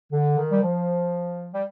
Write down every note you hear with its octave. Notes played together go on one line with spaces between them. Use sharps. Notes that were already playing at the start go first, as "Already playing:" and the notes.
D3
D#3
G3
F3
G3